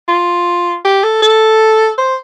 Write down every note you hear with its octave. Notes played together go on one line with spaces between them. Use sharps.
F4
G4
A4
A4
C5